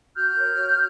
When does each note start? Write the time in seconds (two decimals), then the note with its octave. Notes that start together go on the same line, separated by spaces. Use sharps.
0.15 F#4 F6 G6
0.36 A#4 C#5
0.58 F#4